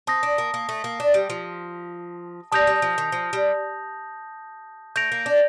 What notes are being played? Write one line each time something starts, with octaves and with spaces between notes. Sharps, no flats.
C4 A5 D#6 A#6
D4
A#3
A#3
A3
A#3
D4
G3
F3
G3 A5 D#6 G6 A#6 F7
G3
F3
D#3
F3
G3
A3 G6 A#6 D7 F7
A#3
D4